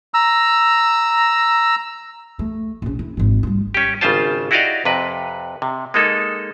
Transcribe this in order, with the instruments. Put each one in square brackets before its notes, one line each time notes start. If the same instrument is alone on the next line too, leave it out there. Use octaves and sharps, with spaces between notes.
[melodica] A#5 E6
[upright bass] A3
A#1 C#4
E4
G#1 D#3
G3 F4
[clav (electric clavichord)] C#4 G4
G#1 C#3 G3 F4 C5 A5
E4 F#4 G4 D5 D#5 F5
F2 C3 B4
C3
G#3 A#3 D#4 A4